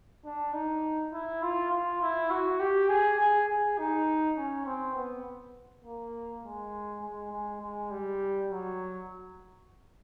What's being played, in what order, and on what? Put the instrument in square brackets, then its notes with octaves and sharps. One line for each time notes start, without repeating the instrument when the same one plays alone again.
[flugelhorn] D4
D#4
E4
F4
F4
E4
F#4
G4
G#4
G#4
G#4
D#4
C#4
C4
B3
A#3
G#3
G#3
G#3
G#3
G3
F#3